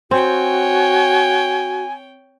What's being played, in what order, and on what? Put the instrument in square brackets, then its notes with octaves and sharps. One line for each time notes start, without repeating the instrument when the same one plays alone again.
[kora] C4 [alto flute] F#4 [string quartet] C#5 G5 [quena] G#5